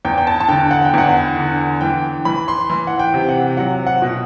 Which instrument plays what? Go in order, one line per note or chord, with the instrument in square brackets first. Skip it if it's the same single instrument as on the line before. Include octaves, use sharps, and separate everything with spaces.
[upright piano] E2 G5
G5
A5
A5
D3 G5
F#5
G5
E2 F#5
D3
E3 G5
E3 B5
C6
E3
F#5
G5
C3
F#5
F#3 F#5
F#5
B2